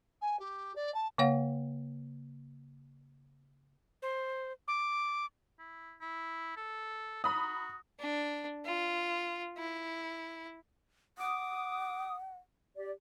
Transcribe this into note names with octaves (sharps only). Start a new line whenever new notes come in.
G#5
G4
D5
A5
C#3 A#3 C#5 F5 F#5
C5
D6
E4
E4
A4
F#4 A#5 B5 D#6
D4
F4
E4
F#5 D6 D#6
G4 D5